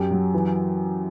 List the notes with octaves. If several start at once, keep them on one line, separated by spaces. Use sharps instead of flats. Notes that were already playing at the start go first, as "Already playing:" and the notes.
Already playing: F#2 G4
F#3
E3